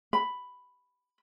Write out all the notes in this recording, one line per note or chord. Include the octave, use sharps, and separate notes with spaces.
B5